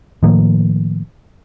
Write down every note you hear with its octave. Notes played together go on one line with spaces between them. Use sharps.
A2 D#3 F3 A#3